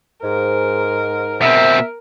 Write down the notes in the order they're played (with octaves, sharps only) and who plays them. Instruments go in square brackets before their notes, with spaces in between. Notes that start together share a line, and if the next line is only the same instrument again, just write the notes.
[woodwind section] G#2 [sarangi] A#4
[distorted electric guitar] B2 C4 [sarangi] A#4 [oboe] E5